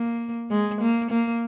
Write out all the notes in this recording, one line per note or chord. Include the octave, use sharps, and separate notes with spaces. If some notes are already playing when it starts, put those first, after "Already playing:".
Already playing: A#3
G#3
A#3
A#3